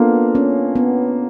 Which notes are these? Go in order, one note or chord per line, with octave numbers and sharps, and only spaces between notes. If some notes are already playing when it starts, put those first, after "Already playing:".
Already playing: A#3 B3 D4 F4 A4
C#4
B3